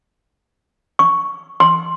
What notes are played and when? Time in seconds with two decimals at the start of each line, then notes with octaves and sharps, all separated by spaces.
0.99 C#6
1.60 C6